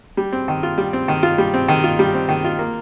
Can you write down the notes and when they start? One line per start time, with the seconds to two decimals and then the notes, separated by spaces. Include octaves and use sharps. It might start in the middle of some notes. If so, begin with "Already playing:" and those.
0.17 G3
0.33 C4
0.48 D#3
0.63 F4
0.78 G3
0.93 C4
1.08 D#3
1.23 F4
1.38 G3
1.54 C4
1.68 D#3
1.84 F4
1.99 G3
2.14 C4
2.29 D#3
2.44 F4
2.59 A#3